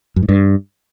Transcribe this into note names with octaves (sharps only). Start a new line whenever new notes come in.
F#2
G#2
G2